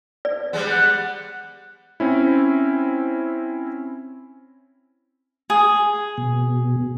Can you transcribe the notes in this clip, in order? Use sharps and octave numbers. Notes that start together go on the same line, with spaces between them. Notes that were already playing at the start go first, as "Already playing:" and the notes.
D5
G3 G#3 B3
F#5
C4 C#4 E4
G#4
B2